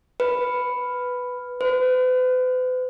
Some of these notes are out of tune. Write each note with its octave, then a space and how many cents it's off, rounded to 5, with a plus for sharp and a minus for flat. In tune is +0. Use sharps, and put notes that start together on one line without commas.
B4 +5
B4 +45